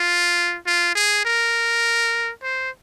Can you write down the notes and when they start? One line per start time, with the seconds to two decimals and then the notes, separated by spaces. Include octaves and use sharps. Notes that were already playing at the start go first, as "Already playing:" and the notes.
Already playing: F4
0.67 F4
0.95 G#4
1.25 A#4
2.43 C5